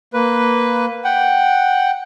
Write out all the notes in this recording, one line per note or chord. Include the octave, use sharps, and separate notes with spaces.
A#3 B4
F#5 G5